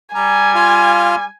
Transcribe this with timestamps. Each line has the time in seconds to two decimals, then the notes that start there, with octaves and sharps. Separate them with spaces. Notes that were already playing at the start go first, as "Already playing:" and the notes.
0.15 G3 G#5 A#5
0.55 F4 F5 F6